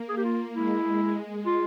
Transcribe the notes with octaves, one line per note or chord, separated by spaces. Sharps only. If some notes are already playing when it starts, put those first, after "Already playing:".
Already playing: A#3
G#4
G4
F4
G#3 E4
F4